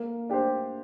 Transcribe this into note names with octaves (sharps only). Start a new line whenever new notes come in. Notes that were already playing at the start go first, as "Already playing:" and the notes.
Already playing: A#3
D4 G4 C5